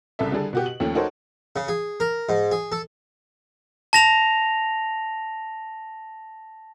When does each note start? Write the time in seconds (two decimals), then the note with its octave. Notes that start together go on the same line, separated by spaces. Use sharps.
0.19 C2 C#3 A4 E5
0.32 D3 G3 G#4 A4
0.53 B2 F#4 G4
0.66 F#7
0.80 D#2 F3 A3 C#4
0.95 D#4 F#4 A4 A#4 C5 C#5
1.56 C#3
1.68 G#4
2.00 A#4
2.29 G#2
2.51 G#4
2.72 A4
3.93 A5 A#6 F7